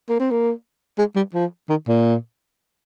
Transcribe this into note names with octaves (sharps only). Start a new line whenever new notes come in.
A#3
C4
A#3
G#3
G3
F3
D#3
A#2